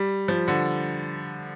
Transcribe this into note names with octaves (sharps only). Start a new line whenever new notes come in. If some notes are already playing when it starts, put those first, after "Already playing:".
Already playing: G3
F3
D3